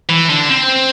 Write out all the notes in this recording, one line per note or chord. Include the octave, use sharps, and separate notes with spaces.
E3
D3
C4